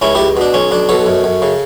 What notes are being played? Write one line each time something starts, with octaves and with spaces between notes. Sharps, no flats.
C#2 C#4 E4
C#2 E4 G4
B2 D4
B1 C#4
B1 D4
B2 A4 C#5
F#2
F#2
C#3